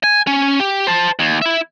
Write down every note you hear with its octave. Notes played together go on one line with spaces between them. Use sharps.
G#5
C#4
G4
C5 A5
D#2
E4 E5